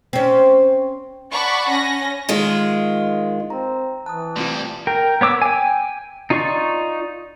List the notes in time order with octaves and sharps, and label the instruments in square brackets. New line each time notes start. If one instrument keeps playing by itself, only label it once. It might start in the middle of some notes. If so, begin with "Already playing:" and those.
[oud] C4 C#4
[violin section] D5 F#5 A5 B5 C#6
C#4 A#6
[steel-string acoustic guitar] D#3 G#3 F4
[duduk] C4 [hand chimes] A#5
[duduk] E3 [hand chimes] A5 D#6 [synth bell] F#6
[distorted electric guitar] C2 G3 [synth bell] A3 C4 F4
[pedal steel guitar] A#4 G5
B3 C#5 D6 E6
G5 G#5
D#4 F4 D5 C#6